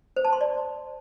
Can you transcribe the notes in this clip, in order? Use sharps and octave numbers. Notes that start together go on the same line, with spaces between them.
C5
A5
C6
D5